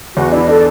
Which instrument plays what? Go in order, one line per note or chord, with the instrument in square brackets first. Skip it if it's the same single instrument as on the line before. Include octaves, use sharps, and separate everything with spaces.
[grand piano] E2 [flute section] F#4
[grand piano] D4 [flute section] E4
[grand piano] D4 [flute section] A4